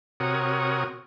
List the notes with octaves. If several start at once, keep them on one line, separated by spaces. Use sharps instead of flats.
C3 F#4 A#4 C#5 D#6